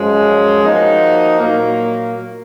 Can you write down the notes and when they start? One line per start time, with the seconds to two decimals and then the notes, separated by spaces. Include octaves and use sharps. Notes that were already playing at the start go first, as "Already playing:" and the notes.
Already playing: F#2 F3 G#3 C#4
0.63 F3 A#3 D#4 F#4
1.38 A#2 F#3 A#3